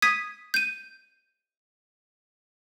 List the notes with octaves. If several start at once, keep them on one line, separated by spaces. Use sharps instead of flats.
D#6 G#6 B6 D#7
G6 D#7